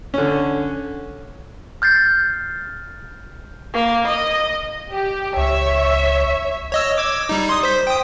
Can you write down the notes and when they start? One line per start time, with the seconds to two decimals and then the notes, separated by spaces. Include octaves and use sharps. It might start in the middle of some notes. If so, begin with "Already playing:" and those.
0.14 D3 C#4
1.82 F6 G6 A6 C7
3.74 A#3
4.06 D#5
4.94 G4
5.37 C#2 C#5 E5
6.72 C#5 D#5 E6
6.98 D6 E6 G#6
7.29 G3 D#4
7.49 C6 D#6
7.63 C5 B6
7.87 G5 D#6